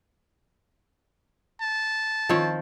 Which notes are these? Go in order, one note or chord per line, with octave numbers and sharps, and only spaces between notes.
A5
D#3 F3 C4 C#5